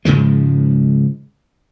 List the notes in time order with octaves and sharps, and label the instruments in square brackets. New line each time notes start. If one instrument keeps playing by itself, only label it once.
[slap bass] G#2 C#3 F3 G#3